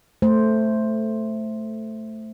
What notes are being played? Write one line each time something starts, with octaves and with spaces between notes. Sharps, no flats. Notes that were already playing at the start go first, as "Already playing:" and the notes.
A3 C5